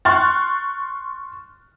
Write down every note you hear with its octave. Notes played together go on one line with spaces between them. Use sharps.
C6 C#6 F6 F#6 A6